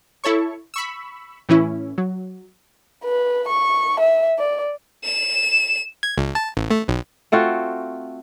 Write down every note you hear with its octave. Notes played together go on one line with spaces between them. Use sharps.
E4 A4 C#5 C#6
B5 C#6 E6
A2 E3 C#4 E4
F#3
B4
C#6
E5
D5
E7
G#6
C#2
A5
A1
A3
B1
A3 C4 F4 F#4